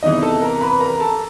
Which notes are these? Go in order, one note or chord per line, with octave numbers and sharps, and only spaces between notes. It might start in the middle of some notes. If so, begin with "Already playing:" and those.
E2 C3 E3 D#4 D#5
A4 A5
A#4 A#5
B4 B5
A#4 A#5
A4 A5